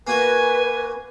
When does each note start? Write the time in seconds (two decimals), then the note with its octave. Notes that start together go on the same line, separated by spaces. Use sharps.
0.07 A#3 F#4 A#4 B4 G#5